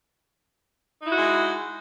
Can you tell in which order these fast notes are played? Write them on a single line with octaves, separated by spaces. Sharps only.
D#4 E4 F#4 G#3